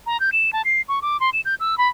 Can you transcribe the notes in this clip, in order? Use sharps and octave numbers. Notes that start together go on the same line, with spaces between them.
A#5
G6
E7
A5
C7
C#6
D6
C6
E7
G6
E6
B5